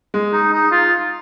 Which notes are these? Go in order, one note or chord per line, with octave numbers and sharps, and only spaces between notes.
G#3
D#4
D#4
F4